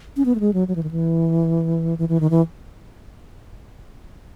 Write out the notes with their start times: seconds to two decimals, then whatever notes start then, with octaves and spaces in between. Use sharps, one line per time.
0.17 C#4
0.25 B3
0.35 A3
0.40 G#3
0.53 F#3
0.68 F#3
0.76 E3
0.83 D#3
0.91 E3
1.98 E3
2.09 E3
2.20 D#3
2.30 E3